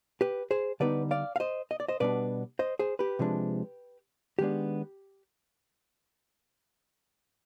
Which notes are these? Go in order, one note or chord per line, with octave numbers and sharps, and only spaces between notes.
G4 B4
G#4 C5
D3 G3 B3 D#4 B4 D5
D5 F5
F5
C5 D#5
D#5
D5
C5 D#5
B2 G3 B3 D4 B4 D5
C5 D#5
G#4 C5
G4 B4
C3 F3 G#3 D4
D#3 G#3 B3 D4 G4